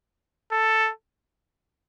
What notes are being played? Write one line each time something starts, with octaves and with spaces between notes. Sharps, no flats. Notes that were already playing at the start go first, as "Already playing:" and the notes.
A4